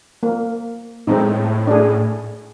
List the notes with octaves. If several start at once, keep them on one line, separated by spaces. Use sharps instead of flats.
A#3
A2 G#3 C4 D#4
D4 G#4